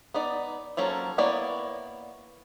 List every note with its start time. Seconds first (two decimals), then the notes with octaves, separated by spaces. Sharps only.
0.14 B3 D#4 D5
0.77 F3 F#3 A#3 C#4 A4
1.18 A#3 B3 E4 C#5 D5